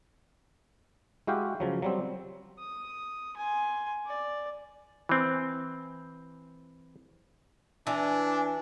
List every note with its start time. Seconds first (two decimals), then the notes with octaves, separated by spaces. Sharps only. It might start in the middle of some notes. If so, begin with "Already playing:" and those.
1.27 G#3 E4 F#4 G4 F5 G5
1.60 C#3 F3 F#3
1.82 F#3 G3 C4
2.59 D#6
3.37 G#5 C6
4.06 D5
5.09 E3 C4
7.87 E3 D4 G#5